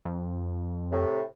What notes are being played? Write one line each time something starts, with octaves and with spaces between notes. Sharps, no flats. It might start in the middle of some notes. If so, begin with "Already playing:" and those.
F2
A2 C3